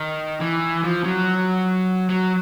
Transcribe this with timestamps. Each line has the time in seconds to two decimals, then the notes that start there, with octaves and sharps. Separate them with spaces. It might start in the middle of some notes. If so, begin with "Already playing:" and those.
Already playing: D#3
0.41 E3
0.84 F3
1.04 F#3
2.10 F#3